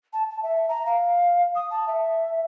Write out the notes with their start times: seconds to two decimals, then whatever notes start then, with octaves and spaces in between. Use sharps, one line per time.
0.13 A5
0.30 A5
0.43 E5
0.69 A#5
0.86 F5
1.55 D#6
1.71 A5
1.87 E5